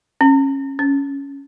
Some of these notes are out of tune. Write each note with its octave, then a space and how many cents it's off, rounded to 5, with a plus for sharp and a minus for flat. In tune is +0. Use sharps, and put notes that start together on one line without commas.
C#4 -20
C#4 +5